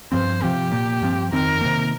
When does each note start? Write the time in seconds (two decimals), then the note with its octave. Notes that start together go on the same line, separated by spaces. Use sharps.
0.12 G2 F3 C4 C5
0.42 C3 F3 C4 G4
0.71 A#2 A#3
1.02 G2 F3 C4
1.32 F2 D#3 C4 A#4
1.61 C3 D#3 A#3